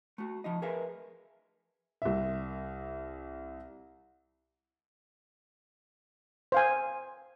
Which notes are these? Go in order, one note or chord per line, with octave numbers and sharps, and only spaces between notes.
A3 F#4
F3 D#4 D#5
G#4 A#4 B4 E5 F5 G#5
C2 E5
C5 F5 G#5